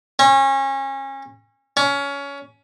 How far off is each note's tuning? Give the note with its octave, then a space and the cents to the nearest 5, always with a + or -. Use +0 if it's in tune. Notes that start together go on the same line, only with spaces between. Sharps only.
C#4 -30
C#4 +20